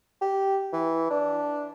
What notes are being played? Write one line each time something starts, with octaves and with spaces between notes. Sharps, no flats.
G4
E3
D4